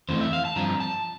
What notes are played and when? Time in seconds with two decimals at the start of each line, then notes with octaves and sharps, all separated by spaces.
0.09 F2 E3 A3 C4 C5
0.21 E5
0.33 F5
0.45 A5
0.56 G2 F3 C4 A#5
0.80 A5